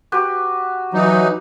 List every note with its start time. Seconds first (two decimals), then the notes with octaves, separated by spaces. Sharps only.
0.12 F#4 G4 B4
0.94 E3 F#3 D#4